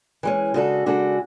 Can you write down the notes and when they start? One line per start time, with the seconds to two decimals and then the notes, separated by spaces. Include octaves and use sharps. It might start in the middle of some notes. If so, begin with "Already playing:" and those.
0.23 E3 G#3 C#4
0.54 C#3 G#3 D4 F#4 A4
0.86 C#3 G#3 D4 F#4 A4